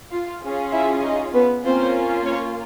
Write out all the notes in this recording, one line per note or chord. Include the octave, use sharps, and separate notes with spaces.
F4 F5
C#4 F4 G#4
E4 E5
D#4 D#5
B3 B4
A#3 C4 C#4 F4 C5
C#4 C#5